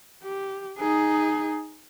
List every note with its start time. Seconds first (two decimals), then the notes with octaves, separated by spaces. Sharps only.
0.23 G4
0.79 D#4 G#4